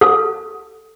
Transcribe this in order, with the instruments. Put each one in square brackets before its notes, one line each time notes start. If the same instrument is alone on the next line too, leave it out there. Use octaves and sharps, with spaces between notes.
[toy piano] A4